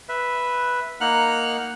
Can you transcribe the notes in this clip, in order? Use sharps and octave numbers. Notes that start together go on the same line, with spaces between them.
B4 E5
A#3 D#4 F#5 F6 F#6